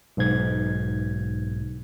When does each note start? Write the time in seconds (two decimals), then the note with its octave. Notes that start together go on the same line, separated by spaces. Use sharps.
0.17 B1 G#2 G#6